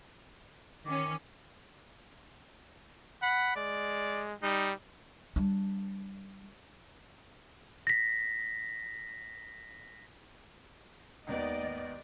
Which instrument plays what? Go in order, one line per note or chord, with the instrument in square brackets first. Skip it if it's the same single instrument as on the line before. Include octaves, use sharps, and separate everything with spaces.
[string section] D#3 C#4 [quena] D6
[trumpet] F#5 [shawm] B5
[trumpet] G#3 [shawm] D5
[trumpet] G3 [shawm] D#4
[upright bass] G3 D4
[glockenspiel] A#6 B6
[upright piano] G#1 D#3 B3 [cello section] D#2 D5 D#5